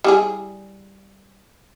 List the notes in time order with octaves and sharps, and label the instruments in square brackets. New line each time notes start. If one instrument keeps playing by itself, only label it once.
[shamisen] G3 E4 G#4